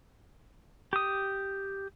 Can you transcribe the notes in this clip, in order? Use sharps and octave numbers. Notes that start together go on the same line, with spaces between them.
G4 D#6